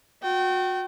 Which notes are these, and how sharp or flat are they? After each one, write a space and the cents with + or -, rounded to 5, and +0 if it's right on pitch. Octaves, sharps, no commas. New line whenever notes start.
F#4 -30 G5 -30